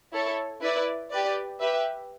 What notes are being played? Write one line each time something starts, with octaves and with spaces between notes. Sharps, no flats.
E4 A4 C#5
E4 B4 D5
G4 B4 D5
G4 B4 E5